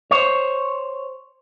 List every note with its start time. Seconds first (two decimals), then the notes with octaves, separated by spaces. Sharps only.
0.11 C5 C#5